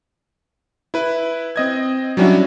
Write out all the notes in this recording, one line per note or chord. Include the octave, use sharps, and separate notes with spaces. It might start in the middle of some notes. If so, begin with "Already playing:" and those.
E4 B4
C4 D#5 G#6
F#3 G3 C#4 D4 E4 F#4